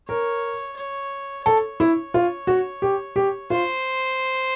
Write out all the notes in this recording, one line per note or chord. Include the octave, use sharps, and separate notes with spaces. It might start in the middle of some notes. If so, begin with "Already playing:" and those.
A#4 C#5
C#5
A4 C#5
E4
F4
F#4
G4
G4
F4 C5